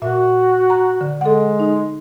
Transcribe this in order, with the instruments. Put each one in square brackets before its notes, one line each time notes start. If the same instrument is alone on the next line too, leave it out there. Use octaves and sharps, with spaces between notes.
[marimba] A#2 E5 [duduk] F#4
[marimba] A#5
D3
[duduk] G#3 [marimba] A4 F#5
[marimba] D#4